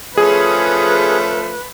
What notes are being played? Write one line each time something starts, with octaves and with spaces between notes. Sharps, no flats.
F3 A3 C#4 G#4 B4